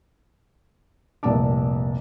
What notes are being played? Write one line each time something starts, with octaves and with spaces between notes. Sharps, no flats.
F1 C2 A#2 D5 A5 D6